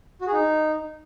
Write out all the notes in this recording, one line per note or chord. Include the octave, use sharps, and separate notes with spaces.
F#4
G#4
D#4